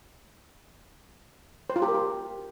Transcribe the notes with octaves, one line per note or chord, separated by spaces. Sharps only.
C5
F4
G4
A#4
G4